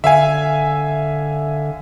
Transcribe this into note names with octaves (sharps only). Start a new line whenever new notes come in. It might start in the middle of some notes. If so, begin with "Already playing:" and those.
D3 E5 F5 G#5